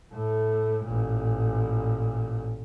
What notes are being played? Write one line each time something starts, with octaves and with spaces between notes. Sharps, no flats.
A2 A3
A1 A#2